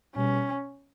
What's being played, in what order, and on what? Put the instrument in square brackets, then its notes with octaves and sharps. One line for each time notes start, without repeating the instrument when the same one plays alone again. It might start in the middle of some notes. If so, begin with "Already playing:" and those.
[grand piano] B2 G3 B3 [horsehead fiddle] C#4